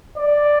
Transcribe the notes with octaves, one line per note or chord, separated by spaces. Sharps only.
D5